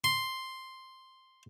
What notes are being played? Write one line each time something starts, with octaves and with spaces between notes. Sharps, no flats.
C6